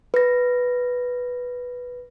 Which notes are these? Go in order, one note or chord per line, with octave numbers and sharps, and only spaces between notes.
B4 A#6